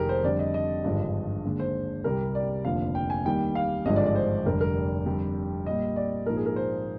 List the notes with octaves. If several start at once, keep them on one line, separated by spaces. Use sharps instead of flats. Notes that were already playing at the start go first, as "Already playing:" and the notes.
Already playing: F1 F2 D#3 G4 G#4 A#4
C5
F2 D3 G3 D5
D#5
D#5
G#1 G2 D3 F3 G#3
D#2 D3 G#3
C5
C2 C3 G3 A#4
D5
F1 D#2 D3 F3 F5
G5
G#5
D#2 D#3 G3 G5
F5
G#1 G2 D3 F3 G#3 D#5
D5
D5
C5
F1 F2 D3 G3 A#4
A#4
F2 D3 G3
A#1 A#2 G3 D#5
D5
A#1 G#2 F3 A#4
G#4
A#4
C5